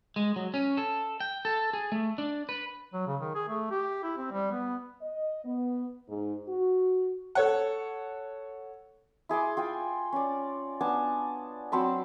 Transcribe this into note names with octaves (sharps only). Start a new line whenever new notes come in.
G#3
F#3
C#4
A4
G5
A4
G#4
A3
D4
B4
F#3
C#3
D#3
G#4
A3
G4
E4
C4
G3
B3
D#5
B3
G#2
F#4
A4 C#5 F#5
E4 G#4 C6 D6
F4 G5 G#5
C#4 D5
B3 D4 G#5 A5
F#3 C4 A5 B5